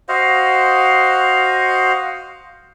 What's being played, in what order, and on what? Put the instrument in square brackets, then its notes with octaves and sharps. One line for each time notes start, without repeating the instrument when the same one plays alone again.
[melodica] F#4 C5 D#5 F5